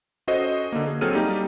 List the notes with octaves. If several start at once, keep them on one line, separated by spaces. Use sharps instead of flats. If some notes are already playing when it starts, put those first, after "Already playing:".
C#4 F#4 A4 C5 D#5
D3 A#3
G#4
F#3 C4 G#4 A4 F6 D#7
G3 A#3 D#4 G4